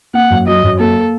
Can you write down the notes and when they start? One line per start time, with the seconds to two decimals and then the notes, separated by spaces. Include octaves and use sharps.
0.14 A#3 F#5
0.30 F#2
0.47 F#3 D#5
0.63 F#2
0.79 A#3 A4